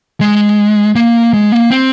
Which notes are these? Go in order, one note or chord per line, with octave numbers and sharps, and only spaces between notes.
G#3
A#3
G#3
A#3
C4